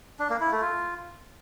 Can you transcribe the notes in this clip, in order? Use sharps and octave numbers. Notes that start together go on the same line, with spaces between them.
D4
A#3
E4
A3
F4